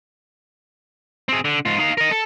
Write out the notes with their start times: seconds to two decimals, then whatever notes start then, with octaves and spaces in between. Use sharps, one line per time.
1.29 C4 G#4
1.45 D3
1.65 G#2 F4
1.79 D#4 F5
1.98 A#4 D#5
2.11 A4